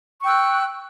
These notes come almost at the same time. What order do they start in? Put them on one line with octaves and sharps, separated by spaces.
C#6 G5 E6 F#6